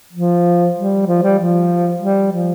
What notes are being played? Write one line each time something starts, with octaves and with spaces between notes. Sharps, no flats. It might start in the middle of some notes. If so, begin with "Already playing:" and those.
F3
G3
F3
G3
F3
G3
F3